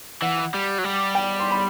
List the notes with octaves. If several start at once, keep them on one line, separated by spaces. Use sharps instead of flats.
E3 F#5
G3
F#3
G3
G5
C6
B5